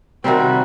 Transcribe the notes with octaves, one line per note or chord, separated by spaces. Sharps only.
C3 D#3 G3 C4 F#4